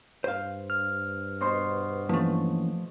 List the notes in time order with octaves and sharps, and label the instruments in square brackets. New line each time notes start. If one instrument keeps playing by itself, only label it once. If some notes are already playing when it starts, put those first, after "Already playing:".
[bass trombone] G2 [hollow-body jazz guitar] C5 F5
[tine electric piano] F6
[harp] B2 C5 C6
[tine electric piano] E3 A#3 C#4 [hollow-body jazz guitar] F3 A3